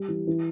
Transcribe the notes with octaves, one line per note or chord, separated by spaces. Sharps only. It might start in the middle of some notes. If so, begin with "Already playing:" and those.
Already playing: G3
E3
E3